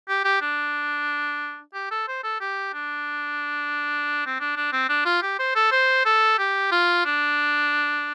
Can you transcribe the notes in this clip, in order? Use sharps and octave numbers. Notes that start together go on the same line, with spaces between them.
G4
G4
D4
G4
A4
C5
A4
G4
D4
C4
D4
D4
C4
D4
F4
G4
C5
A4
C5
A4
G4
F4
D4